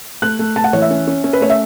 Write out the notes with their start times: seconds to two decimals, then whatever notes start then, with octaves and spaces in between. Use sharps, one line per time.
0.22 A3 F#6
0.39 A3
0.56 A3 A5
0.64 F#5
0.73 E3 C#5
0.82 E5
0.90 C#4
1.07 C#4
1.24 C#4
1.33 B4
1.41 A3 C#5
1.50 E5